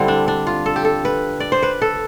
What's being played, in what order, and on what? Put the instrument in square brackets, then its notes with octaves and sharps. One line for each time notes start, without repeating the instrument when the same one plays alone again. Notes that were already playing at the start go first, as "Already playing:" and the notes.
Already playing: [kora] D3 G3 C4 E4
D4
D4
F4
A4
G4
A4
B4
D5
C5
B4
A4